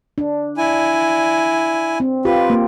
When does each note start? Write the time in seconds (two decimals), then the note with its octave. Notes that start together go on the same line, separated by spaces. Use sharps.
0.18 D4
0.58 E4 G#5
2.00 C4
2.25 F4 G4 B4
2.50 A#3